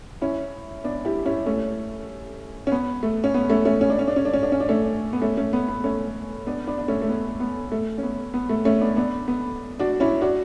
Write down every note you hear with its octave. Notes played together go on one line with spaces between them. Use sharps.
C#4 E4
B3 D4
E4 G4
C#4 E4
A3 C#4
C#4
B3
A3
C#4
B3
A3 C#4
A3 C#4
C#4
D4
C#4
D4
C#4
D4
C#4
D4
C#4
D4
A3 C#4
B3
A3 C#4
A3 C#4
B3
B3
A3 C#4
B3 D4
B3 D4
D4
A3 C#4
A3
B3
B3
A3
C#4
B3
B3
A3
A3 C#4
B3 D4
B3 D4
B3
D4 F#4
C#4 E4
D4 F#4